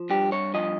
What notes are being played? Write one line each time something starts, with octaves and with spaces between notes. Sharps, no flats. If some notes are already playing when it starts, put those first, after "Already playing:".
Already playing: F3
G2 G4
C#5
F3 D#5